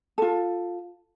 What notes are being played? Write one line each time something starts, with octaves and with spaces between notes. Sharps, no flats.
F4 A4